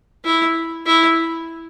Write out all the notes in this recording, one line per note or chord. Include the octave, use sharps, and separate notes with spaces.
E4
E4